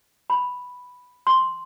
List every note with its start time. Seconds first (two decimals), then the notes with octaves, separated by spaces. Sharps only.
0.30 B5
1.27 C6